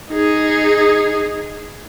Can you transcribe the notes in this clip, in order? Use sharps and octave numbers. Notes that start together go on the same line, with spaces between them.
D#4 G#4